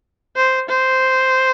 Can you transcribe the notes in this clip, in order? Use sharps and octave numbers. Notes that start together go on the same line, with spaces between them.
C5
C5